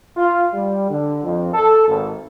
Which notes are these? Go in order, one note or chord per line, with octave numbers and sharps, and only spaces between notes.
F4
G3
D3
F2
A4
G#1